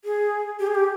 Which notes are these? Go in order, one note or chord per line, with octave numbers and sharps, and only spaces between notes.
G#4
G4
G#4
G4